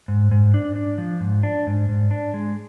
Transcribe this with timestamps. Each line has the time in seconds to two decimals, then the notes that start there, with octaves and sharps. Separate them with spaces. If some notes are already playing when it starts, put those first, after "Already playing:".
0.08 G#2
0.31 G#2
0.54 D4
0.76 D4
0.98 F3
1.21 G#2
1.43 D4
1.67 G#2
1.89 G#2
2.11 D4
2.34 G#3